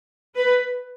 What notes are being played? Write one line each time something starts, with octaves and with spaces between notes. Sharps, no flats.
B4